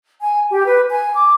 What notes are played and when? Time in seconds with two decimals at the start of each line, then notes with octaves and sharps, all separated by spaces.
0.21 G#5
0.48 G4
0.65 B4
0.89 G#5
1.14 D6